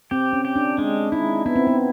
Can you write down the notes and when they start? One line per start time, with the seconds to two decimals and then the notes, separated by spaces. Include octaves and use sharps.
0.11 C4 G4
0.33 C#4
0.45 G4
0.56 D4
0.78 G#3 D4
1.12 D#4 E4
1.46 B3 E4
1.56 C4
1.67 B3